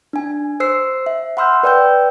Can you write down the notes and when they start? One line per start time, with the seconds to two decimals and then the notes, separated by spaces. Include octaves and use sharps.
0.13 D4 G#5
0.60 C5 E6 C7
1.06 E5
1.37 F#5 B5 C6 E6 F6 G6
1.63 B4 D5 G5 E6 G6